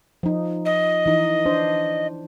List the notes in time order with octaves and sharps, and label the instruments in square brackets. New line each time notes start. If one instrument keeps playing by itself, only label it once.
[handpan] F3 D#4
[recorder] D#5
[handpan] E3 D#4
D4 C5